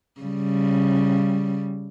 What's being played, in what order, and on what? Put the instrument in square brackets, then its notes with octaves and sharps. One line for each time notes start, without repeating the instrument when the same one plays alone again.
[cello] C#3 G3